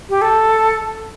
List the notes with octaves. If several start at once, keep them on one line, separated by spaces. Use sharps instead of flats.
G4
A4